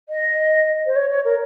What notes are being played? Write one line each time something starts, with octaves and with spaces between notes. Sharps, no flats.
D#5
C5
C#5
C#5
A#4